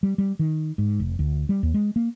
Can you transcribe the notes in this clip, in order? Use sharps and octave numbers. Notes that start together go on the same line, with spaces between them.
G3
G3
D#3
G#2
F1
D2
G3
D#2
G#3
A#3